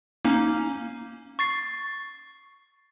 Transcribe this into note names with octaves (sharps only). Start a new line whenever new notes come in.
A#3 C#4 D#4
C#6 A6 C7